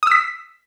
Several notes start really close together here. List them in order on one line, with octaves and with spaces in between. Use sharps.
D#6 E6 B6